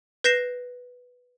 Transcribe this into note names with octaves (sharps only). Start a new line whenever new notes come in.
B4 G6 A#6 C7 E7